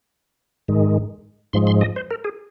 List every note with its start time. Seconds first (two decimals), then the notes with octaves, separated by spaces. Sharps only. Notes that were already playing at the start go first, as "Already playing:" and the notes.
0.68 G#2 D#3 G#3
1.53 G#2 F3 G#3 C6
1.67 C6
1.81 D#5
1.96 C5
2.11 A#4
2.24 G#4